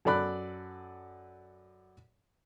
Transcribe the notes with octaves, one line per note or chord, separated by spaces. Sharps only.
F#2 A4 D5 B5 F#6